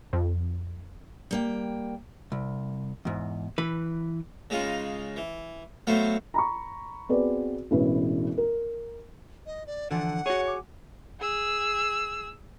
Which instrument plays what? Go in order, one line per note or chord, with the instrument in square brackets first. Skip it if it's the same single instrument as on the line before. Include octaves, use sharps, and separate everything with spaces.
[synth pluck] F2
[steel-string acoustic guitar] G3 A#3 G5
[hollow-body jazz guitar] C2
E2 G#2
E3 B4
[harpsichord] C#3 G#3 D#4 F4
E3
F#3 A3 B3 C5 F5
[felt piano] A#5 B5 C#6
B3 C4 F#4 G#4 B4 D5
E1 A1 E4 B4
A#4
[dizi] D#5
D5
[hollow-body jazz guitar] D3 E3 F3 [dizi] F#5
[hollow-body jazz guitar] F#4 G#4 [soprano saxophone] C#5
[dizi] D6
[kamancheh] G#4 E6